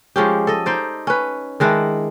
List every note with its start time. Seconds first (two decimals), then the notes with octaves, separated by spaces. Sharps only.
0.16 F3 G#3 C#4 G4
0.47 A4 D#5
0.66 D#4 C5 D5
1.07 C#4 B4
1.60 D#3 G#3 D4 E4